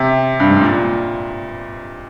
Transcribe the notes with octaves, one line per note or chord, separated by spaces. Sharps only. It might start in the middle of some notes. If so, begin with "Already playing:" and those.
Already playing: C3
G2
G#2
A#2